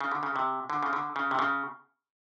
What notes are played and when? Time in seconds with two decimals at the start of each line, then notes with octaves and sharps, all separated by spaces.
0.01 C#3
0.11 D3
0.23 C#3
0.36 C3
0.70 D3
0.83 C#3
0.93 D3
1.16 C#3
1.31 C3
1.39 C#3